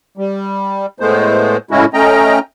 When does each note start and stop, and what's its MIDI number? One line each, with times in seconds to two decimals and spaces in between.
0.18 0.86 55
1.00 1.57 45
1.00 1.57 56
1.00 1.57 57
1.00 1.57 59
1.00 1.57 72
1.71 1.85 45
1.71 1.85 49
1.71 1.85 56
1.71 1.85 61
1.71 1.85 64
1.71 1.85 66
1.94 2.39 57
1.94 2.39 61
1.94 2.39 75
1.94 2.39 79
1.94 2.39 82